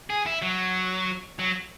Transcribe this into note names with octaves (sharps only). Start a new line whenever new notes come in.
G#4
E4
F#3
F#3